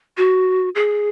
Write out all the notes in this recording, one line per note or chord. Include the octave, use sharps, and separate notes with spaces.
F#4
G#4